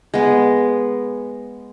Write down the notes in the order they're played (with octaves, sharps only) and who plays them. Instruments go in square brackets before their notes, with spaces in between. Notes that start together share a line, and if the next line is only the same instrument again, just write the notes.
[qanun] G#3 B3